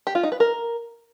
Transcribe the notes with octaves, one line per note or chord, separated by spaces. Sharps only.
G4
F4
D#4
B4
A#4